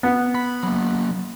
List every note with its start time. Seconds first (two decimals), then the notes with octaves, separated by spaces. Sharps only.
0.03 B3
0.35 B5
0.63 F#3 A#3